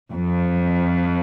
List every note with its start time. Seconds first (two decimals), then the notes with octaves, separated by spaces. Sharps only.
0.12 F2